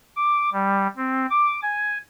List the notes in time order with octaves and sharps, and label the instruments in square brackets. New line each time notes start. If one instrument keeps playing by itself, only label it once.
[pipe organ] D6
G3
C4
D6
G#5